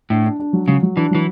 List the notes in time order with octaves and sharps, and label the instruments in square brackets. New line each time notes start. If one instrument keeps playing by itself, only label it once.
[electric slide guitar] A2 [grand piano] D4
[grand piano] D4
D4
F#3
[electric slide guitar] C#3 [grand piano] F#3
[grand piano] F#3
[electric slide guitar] E3 [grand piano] D4
[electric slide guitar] E3 [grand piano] F#3